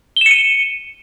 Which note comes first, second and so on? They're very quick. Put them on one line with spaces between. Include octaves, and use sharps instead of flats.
G7 E7 C#7 D#7